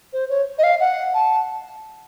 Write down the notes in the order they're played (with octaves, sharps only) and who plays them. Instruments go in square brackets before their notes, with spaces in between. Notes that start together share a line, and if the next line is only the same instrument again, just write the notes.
[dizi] C5
C#5
D#5
F5
F#5
A5